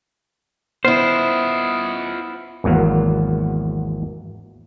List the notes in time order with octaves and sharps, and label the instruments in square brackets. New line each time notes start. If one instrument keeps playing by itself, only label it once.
[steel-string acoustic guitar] B3 E4 [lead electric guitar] F4 D#5 [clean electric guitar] C5
[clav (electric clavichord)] G#1 E2 F#3 A#3 B3